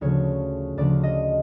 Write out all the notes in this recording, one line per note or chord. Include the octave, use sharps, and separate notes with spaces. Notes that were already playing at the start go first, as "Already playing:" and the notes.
D2 C#3 F3 C#5
D2 C#3 F3 D5
D#5